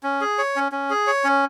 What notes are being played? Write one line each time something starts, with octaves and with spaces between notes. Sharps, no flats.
C#4
G#4
C#5
C#4
C#4
G#4
C#5
C#4